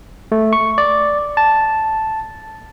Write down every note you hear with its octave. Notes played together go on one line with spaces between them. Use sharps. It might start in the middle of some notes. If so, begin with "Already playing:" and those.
A3
C#6
D5
A5